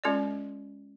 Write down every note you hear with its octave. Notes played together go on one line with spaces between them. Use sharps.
G#3 C#4 F4 A4 D5